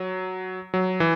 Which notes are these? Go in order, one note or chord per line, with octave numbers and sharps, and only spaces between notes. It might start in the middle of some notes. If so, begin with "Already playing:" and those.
Already playing: F#3
F#3
E3